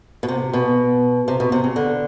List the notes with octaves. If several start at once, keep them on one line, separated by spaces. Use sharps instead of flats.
B2
C3
B2
C3
B2
C3
C#3
D3